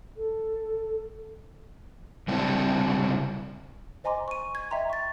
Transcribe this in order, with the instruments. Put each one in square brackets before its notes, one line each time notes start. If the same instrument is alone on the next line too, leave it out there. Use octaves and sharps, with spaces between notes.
[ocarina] A4
[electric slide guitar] C#3 G3 C4 D4 E4
[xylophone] C5 D#5 G#5 A#5 C6 D6
C#6 D#7
G#6
D#5 E5 G5 A#5 C6
C#6 A6